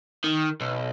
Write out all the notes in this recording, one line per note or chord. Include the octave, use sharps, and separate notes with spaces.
D#3
B1